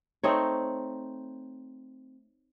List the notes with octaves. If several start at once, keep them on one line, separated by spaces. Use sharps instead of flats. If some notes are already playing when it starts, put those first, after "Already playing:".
A3 C4 D#4 C#5